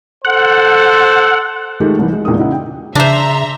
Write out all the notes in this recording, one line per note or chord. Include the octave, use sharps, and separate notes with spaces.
A4 C5 F#5
D#3 G#3 A3 F4 G4 A4
C2 E3
G#3
E2 A#2 G#3 D4 D#6
C#3 D#4 E4 F#5
G5
C#3 D4 C5 E5 A#5 C6